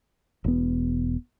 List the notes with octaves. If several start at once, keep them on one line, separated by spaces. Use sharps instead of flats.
E1 B3